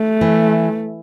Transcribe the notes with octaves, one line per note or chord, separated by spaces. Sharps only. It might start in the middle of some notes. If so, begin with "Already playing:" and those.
Already playing: A3
E3